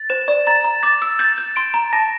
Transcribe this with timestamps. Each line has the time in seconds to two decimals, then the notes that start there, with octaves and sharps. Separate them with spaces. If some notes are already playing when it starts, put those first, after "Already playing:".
Already playing: A6
0.10 C5 E7
0.28 D5
0.47 A#5 A6
0.64 A#5
0.83 D6 A6
1.02 E6
1.19 G6 A6
1.38 G6
1.56 C6 D7
1.74 A#5
1.93 A5 A#6